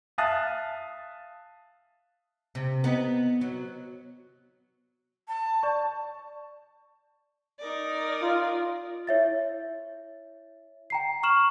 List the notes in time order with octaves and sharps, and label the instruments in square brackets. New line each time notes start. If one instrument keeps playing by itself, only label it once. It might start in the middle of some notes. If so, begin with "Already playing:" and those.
[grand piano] E5 F5 A5 D#6 F#6 A6
[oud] C3
B3 D#4
F#3
[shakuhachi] A5
[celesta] D5 C#6
[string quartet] D#4 A#4 D5
[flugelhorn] F4
[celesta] E4 C#5 E5 A6
G5 A#5 C7
C#6 F6 E7 F#7